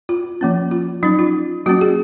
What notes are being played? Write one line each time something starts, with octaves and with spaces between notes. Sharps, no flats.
F4
F3 A#3 C#4
F4
F#3 C#4 D#4
F4
F#3 A#3 C#4 F#4
G#4